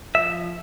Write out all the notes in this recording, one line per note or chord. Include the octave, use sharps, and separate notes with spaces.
F3 E5